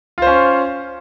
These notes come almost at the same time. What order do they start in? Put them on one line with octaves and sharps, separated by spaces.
F4 C5 C#4